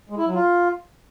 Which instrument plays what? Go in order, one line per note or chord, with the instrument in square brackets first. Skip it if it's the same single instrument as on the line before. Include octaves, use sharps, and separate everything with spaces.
[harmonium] G#3
E4
F#3
F4